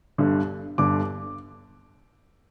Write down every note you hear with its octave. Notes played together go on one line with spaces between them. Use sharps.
G1 G2 D3
G1 G2 D3 D6